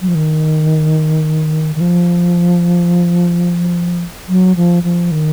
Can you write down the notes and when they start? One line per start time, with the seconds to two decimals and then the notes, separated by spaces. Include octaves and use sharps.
0.01 F#3
0.08 F3
0.15 D#3
1.75 D#3
1.81 F3
4.28 F#3
4.56 F3
4.83 F3
5.11 D#3